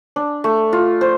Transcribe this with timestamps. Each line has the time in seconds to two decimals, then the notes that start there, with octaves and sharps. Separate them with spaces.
0.16 D4
0.44 A3
0.73 F4
1.01 C5